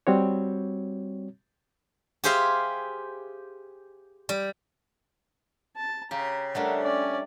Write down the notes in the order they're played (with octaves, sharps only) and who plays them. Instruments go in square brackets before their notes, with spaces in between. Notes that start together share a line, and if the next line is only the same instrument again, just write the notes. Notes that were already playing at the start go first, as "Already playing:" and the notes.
[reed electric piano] G3 C4 F#4 C#5
[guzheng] G4 G#4 C5 E5 F5
G3
[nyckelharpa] A5
[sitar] C#3 [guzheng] G4 [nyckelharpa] A#5
[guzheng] G3 A3 D4 [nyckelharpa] A4 A#4 [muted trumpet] F#5
[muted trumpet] C#4 [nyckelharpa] D5